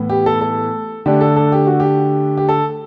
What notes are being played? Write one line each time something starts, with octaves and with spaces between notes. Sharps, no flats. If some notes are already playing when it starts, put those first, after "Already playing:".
Already playing: A2 E3 B3
G4
A4
A4
D3 A3 D4 G4
A4
A4
G4
F#4
G4
G4
A4